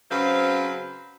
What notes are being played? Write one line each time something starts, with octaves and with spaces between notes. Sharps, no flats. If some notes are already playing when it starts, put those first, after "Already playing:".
C#3 F#3 C4 B4 C5 F5